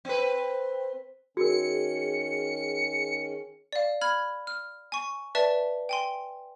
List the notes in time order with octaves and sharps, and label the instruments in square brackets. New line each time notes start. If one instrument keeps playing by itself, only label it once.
[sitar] C4 B4
[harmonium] D#3 C#4 [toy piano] F#4 A#4 [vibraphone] G#4 [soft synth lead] C#7
[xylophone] D5 F5
B5 F6 G#6
F6
G#5 C#6
B4 D5 E5 A5
G5 G#5 C6